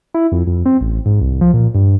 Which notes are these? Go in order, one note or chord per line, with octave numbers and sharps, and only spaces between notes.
E4
F2
F2
C4
A1
G#2
C2
F3
A#2
G2